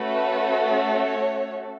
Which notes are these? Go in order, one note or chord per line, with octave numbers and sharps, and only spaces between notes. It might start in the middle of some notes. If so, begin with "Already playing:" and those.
Already playing: A3 C#4 F#4 A4 B4
C#5